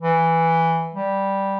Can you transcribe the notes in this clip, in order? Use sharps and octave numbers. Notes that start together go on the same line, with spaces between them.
E3
G3